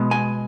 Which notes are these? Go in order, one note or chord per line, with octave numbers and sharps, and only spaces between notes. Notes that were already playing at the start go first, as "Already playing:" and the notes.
Already playing: B2 G#3 B3
G#5